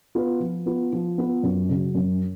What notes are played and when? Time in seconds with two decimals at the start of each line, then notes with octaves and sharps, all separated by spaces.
0.15 B3 F4 B4
0.40 F3
0.66 B3 F4 B4
0.93 F3
1.18 B3 F4 B4
1.43 F#2
1.69 C#3 F#3
1.95 F#2